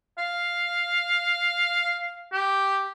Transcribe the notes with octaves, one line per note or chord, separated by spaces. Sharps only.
F5
G4